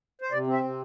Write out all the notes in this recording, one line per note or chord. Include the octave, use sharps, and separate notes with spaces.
C5
C3 D5
C4
E5
C3